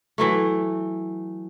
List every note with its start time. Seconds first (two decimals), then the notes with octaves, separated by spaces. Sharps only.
0.18 E3 F#3 A3